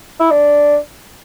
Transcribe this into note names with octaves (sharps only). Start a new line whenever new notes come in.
E4
D4